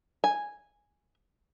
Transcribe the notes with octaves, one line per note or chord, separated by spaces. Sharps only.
G#5